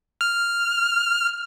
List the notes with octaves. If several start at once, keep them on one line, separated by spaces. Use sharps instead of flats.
F6